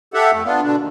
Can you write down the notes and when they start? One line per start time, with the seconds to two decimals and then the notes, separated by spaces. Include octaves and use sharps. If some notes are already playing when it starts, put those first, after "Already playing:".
0.14 G4 A4 E5 F#5
0.31 F2 A3
0.44 B3 D4 F4
0.62 B2 D3 D4
0.76 D#2